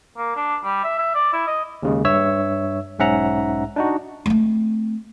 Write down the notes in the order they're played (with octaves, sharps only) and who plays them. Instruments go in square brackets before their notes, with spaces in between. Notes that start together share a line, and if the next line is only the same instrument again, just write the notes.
[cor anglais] A#3
D4
G3
E5
E5
D5
E4
D#5
[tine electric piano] D#2 C#3 G#3
G2 C#5 E5 E6
B1 G#2 C#4 E5 F#5 A#5
D4 D#4 F#4
[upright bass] A3 C4